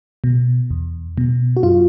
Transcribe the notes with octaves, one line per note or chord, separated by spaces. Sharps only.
B2
E2
B2
F#4
F#2 F4